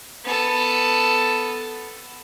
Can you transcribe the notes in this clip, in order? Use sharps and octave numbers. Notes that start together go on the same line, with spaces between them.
B3 A4